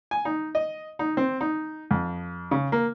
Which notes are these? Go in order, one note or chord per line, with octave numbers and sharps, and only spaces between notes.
G#5
D#4
D#5
D#4
C4
D#4
F2
C#3
A#3